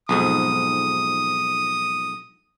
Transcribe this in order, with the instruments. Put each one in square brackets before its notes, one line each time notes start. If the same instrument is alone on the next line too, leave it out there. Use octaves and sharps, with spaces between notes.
[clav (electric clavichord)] B1 F2 G#2 [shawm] D#6